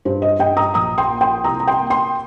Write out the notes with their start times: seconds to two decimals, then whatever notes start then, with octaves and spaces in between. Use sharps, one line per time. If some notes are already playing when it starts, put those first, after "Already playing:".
0.05 G2 C5
0.22 D#5
0.39 G2 D#5 G5
0.57 A#5 D#6
0.74 A#1 A#5 D#6
0.98 G5 C6
1.10 A#3
1.21 G5 C6
1.44 C2 A#5 D#6
1.60 A#5
1.67 G5 C6
1.79 A#3
1.90 G5 C6